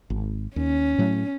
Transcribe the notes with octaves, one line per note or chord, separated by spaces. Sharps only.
G#1
D#2 C#4
A2 F#3 A3